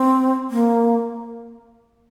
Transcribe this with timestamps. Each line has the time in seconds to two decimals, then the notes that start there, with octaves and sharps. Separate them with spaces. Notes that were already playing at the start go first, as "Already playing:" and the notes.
Already playing: C4
0.50 A#3